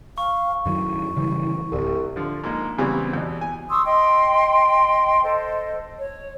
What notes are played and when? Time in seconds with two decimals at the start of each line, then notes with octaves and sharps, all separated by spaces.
0.18 F5 C#6
0.66 F#2 D#3 F#3 E4
1.17 C#3 E3 G3
1.72 D1 C2
2.16 D3 F3
2.44 G#2 A#3
2.78 C#3 E3 G3 B3 C4
3.13 E2 B2
3.41 G#5
3.69 C6 C#6 D#6 E6
3.85 D#5 G5 C6
5.23 A4 C5 D#5
5.98 C#5